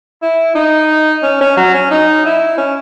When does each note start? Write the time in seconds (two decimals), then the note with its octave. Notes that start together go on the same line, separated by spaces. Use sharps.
0.22 E4
0.55 D#4
1.23 C#4
1.41 C#4
1.57 F#3
1.74 C#4
1.91 D#4
2.25 E4
2.58 C#4